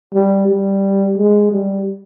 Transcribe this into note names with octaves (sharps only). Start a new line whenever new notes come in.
G3
G3
G#3
G3